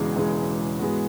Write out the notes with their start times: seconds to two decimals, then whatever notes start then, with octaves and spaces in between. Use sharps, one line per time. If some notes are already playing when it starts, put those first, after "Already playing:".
Already playing: E1 E2 C#3 E3 G#3
0.16 E1 E2 C#3 E3 G#3
0.79 G#2 E3 G#3 B3 F#4